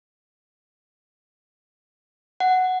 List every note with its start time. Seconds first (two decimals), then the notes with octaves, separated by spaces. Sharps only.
2.40 F#5